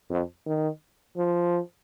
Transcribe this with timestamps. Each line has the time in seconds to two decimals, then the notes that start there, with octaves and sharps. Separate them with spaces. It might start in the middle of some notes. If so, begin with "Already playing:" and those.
0.10 F2
0.46 D#3
1.17 F3